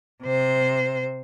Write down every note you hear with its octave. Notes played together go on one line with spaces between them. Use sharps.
C3 C5